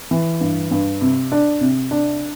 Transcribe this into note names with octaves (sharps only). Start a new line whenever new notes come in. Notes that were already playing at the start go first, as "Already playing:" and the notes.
E3
G2
G2
C3
D4
C3
D4